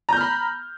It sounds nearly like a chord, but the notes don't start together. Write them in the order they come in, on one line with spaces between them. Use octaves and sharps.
A#5 G6 F6 B5